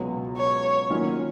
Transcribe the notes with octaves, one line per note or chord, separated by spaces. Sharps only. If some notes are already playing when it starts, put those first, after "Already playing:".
Already playing: C#2 B2 F#3
C#5
D#3 F#3 A#3 C#4 F4